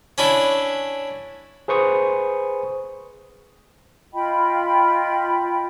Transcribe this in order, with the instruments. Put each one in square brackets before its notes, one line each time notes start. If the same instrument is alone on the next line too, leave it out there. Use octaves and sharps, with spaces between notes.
[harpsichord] C#4 D4 E4
[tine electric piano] G#4 B4 C5 C#6 D#6
[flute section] F4 D#5 G5 B5